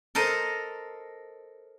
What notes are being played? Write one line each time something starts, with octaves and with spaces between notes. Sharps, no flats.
A4 A#4 C5 D#5